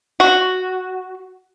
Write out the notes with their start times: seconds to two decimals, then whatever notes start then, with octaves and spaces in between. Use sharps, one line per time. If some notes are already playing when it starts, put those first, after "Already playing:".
0.20 F#4